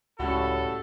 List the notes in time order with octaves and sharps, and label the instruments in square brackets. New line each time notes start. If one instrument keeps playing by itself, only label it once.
[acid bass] C#2 [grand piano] A2 G3 C#4 [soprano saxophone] F#4 [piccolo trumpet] A4